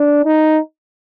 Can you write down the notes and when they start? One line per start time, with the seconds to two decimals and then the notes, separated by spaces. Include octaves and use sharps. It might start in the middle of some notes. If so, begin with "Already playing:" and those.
Already playing: D4
0.25 D#4